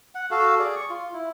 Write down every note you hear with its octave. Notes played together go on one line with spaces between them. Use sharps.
F#5
F#4 A4 F5
G#4 D5
C#6
F4
E4